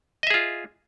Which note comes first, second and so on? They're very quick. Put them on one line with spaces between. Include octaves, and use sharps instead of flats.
D#5 E5 G#4 F4